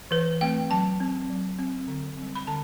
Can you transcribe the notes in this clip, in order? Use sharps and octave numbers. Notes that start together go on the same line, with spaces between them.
E3 B4
A3 C4 G5
F#3 A5
C4
F#3
C4
D3
G3 C4
B5
D3 A5